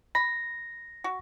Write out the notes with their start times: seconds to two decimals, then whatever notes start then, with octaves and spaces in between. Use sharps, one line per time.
0.15 B5 A#6
1.04 F#4